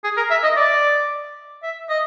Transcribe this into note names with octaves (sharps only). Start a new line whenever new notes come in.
G#4
A#4
E5
D#5
D5
E5
D#5